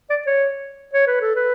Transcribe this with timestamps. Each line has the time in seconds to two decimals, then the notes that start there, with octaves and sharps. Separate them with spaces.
0.10 D5
0.27 C#5
0.94 C#5
1.07 B4
1.22 A4
1.36 B4